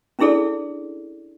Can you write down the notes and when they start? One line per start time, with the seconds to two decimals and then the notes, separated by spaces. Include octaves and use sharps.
0.19 C#4 D4 E4 G#4 A4 D5